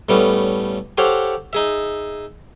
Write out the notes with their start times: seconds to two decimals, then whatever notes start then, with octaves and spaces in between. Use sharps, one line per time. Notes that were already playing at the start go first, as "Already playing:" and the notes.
0.09 A2 G3 A3 B3 C#4
0.98 G4 A4 C5 C#5 F5 F#5
1.53 D#4 G#4 E5